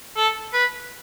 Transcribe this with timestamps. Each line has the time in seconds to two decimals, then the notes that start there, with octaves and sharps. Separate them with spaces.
0.17 A4
0.53 B4